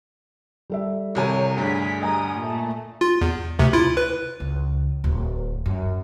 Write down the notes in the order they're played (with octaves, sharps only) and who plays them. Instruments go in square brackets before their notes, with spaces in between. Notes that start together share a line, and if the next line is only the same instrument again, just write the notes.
[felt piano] G3 A4 E5
[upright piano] C2 C3 G#5 [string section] C#5
[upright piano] D2 G2 [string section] G#4 B6
[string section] G3 D#6 [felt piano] D#5 G#5 A#5
[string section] A#2 A3
[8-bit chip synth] F4
E2
D2 C3
E4 F4
B4
[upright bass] C#2
D1
F#2